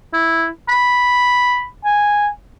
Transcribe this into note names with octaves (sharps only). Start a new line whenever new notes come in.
E4
B5
G#5